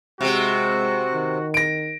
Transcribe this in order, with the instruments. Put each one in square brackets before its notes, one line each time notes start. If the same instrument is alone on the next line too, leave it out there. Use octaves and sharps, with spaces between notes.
[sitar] C3 C4 [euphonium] G#3 [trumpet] F#4
[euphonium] D#3
[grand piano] A#6 D7